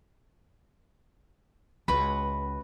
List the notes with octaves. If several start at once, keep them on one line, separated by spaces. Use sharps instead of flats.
C#2 F#4 B4 B5